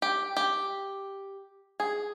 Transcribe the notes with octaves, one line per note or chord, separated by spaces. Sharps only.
G4
G4
G#4